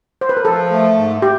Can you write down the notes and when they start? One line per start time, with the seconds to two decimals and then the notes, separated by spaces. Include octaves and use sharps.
0.21 C5
0.29 B4
0.37 A#4
0.45 F3 A4
0.70 A3
0.96 G#2
1.22 G4